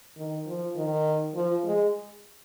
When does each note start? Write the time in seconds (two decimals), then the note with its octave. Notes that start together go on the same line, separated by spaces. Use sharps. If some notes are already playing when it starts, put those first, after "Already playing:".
0.17 D#3
0.46 F3
0.76 D#3
1.35 F3
1.64 G#3